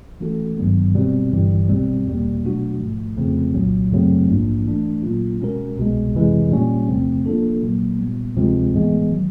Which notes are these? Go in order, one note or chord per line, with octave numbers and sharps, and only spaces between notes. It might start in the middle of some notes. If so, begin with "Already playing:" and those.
E3 A3 C#4 F#4 A4
G#1 G2 D#3 F#3 B3
B2 G3 C4
G1 G2 E3 G3
B1 B2 G3 C4
E2 B2 G3 A#3
B2 F#3 A3 D4 F#4
A1 G#2 F3 A3
F2 C#3 F3 A3 C4
C2 A#2 F#3
F#2 C#3 F#3 A3 C4
A#1 G#2 F3 A#3 D4
E3 A3 D4
A#2 F#3 A#3 C#4 F4
B2 G#3 C#4 F#4 A#4
C2 B2 G#3
F2 C3 E3 G#3
A#2 G3 A#3 C#4
E2 C3 F3 A3 C4
F3 A#3 D4 F4 A4
A#1 A#2 F#3 A#3
A#2 G3 B3
D2 C3 F3 G#3 C4
A2 E3 G#3 B3
D#3 F#3